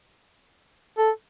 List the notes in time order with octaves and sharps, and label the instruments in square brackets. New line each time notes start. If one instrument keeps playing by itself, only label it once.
[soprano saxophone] A4